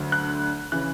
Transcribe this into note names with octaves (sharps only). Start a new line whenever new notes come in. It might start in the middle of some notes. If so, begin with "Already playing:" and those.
Already playing: D2 D3 F#3
F#6
C#3 E3 F#6